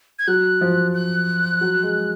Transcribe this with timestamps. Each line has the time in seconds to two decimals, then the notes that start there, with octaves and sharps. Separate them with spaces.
0.19 G#6
0.28 F#3 F#6
0.61 F3
0.94 F#6
1.61 F#3
1.83 G#3